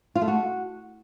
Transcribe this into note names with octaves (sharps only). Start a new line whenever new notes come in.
F4
A3
F#4